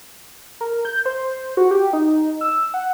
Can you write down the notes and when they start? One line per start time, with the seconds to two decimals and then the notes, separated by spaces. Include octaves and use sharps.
0.61 A#4
0.85 G6
1.06 C5
1.57 F#4
1.71 G4
1.93 D#4
2.41 E6
2.74 F#5